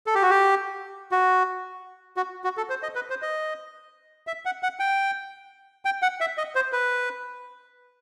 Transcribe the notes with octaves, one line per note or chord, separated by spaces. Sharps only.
A4
G4
F#4
G4
F#4
F#4
F#4
A4
C5
D#5
B4
C5
D#5
E5
F#5
F#5
G5
G5
F#5
E5
D#5
C5
B4